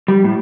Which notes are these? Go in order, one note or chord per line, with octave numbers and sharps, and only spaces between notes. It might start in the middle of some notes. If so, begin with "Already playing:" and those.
G3
A2